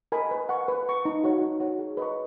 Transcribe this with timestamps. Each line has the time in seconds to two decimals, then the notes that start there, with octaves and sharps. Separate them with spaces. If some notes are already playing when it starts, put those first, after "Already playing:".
0.12 A#4 D#5 G#5 B5
0.31 B4
0.49 F#5 C#6
0.68 B4
0.86 F#5 C#6
1.05 D#4
1.24 F#4 C#5 F#5
1.42 D#4
1.60 F#4 C#5 F#5
1.79 G#4
1.97 B4 D#5 A#5 C#6